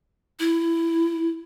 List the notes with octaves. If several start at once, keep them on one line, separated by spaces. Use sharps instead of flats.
E4